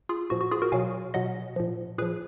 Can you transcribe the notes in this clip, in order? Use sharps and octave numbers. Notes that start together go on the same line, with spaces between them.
F4 G#4
A#2 F3 F#4
F#4
F4 G#4
F#4 A#4
B2 F#3 F5 G#5
B2 F#3 D#5 F#5
A#2 F3
A#2 F3 G#4 B4